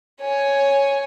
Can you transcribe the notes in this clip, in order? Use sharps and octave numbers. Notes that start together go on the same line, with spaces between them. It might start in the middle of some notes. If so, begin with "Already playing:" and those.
C#5 G#5